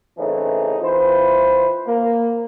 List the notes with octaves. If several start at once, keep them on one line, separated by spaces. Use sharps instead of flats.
A2 C#3 E3 A3 C4 D#4
E3 C4 F4 B4 C5
A#3